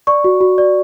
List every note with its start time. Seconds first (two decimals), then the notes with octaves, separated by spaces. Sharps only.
0.07 D5 C#6
0.24 F#4
0.41 F#4
0.58 D5